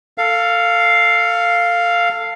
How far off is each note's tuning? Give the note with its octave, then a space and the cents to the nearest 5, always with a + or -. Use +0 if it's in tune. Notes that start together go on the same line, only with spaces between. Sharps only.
A4 +20 F5 +0